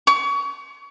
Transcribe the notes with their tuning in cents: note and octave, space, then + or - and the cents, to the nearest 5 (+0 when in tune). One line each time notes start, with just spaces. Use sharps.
C#6 +30